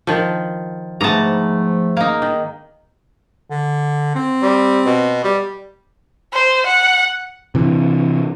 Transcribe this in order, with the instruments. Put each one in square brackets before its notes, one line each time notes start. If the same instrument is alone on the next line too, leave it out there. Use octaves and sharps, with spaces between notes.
[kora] D#3 F3
[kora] G#2 B3 [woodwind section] F3 A3 [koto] A5 A#5
[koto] A#3 D#4
[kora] D#3
[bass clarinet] D3
C4
[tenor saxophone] G3
B2
G3
[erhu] C5
F#5
[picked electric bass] C3 E3